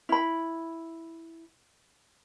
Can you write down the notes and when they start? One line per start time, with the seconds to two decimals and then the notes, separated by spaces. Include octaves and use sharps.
0.09 E4 B5